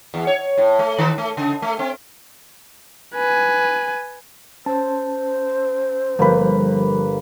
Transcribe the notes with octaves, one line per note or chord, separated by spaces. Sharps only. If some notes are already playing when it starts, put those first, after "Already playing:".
E2
C#5
A2
A3
D#3
A3
C#3
A3
C4
B4 G#5
C#4 C5 A5
G1 F3 A#3 G4 B4